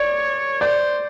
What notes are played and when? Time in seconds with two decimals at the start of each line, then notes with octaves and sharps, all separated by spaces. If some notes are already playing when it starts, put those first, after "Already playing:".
Already playing: C#5 D5
0.61 C5 D5